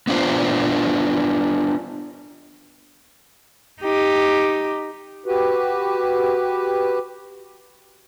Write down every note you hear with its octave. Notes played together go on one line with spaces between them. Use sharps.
B3 D4 F4 C5
D#4 G4
F#4 G4 B4